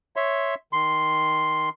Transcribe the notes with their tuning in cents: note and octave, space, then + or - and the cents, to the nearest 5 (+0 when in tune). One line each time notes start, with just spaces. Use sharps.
C#5 +0 E5 +0 C6 +0
D#3 +0 C6 +0